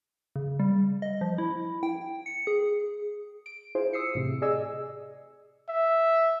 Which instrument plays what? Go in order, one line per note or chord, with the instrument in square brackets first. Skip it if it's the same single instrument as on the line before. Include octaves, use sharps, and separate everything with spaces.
[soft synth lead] C#3
G3
D#5
F3
E4
G5
C#7
G#4
[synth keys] D7
E4 F4 G#4 C5
D#6 E6 C7 C#7
A2 C3
G#4 D5 D#5 G#5 E6
[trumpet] E5